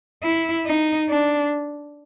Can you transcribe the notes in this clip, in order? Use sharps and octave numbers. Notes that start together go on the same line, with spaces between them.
E4
D#4
D4